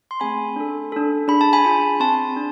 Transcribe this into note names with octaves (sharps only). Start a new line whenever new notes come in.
C6
A3 C4 G#4 G#5 B5
D4 A4
D4 A4
D4 G#4 B5
A5
G#5 B5
D4 F4 G#4
C4 G#4 A5 C6
D4